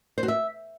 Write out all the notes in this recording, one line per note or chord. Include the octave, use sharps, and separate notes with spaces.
C5
F#4
E5